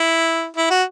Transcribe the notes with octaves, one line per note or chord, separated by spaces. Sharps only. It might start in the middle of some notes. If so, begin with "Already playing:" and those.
Already playing: E4
E4
F#4